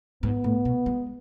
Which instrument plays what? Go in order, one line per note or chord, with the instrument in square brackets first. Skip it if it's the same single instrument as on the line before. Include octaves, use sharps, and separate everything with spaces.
[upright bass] G#2 [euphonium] B3
[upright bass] A2
B2
G#3